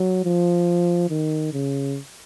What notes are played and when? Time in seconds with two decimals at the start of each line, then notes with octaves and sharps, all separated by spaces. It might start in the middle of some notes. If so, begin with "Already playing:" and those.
Already playing: F#3
0.24 F3
1.10 D#3
1.53 C#3